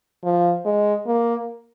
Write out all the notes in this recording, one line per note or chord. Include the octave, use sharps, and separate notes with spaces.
F3
G#3
A#3